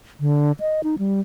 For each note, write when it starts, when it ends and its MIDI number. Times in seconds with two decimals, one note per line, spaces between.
0.20 0.52 50
0.60 0.81 75
0.84 0.95 63
0.98 1.21 55